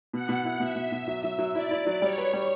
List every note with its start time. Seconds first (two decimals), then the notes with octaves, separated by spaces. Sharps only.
0.13 B2 F#5
0.29 B2
0.45 E4
0.60 B2 E5
0.76 B2
0.92 B2
1.08 F#3
1.24 F#3
1.39 F#3
1.55 E4 D5
1.71 E4
1.87 F#3
2.02 G3 C#5
2.18 B4
2.33 G3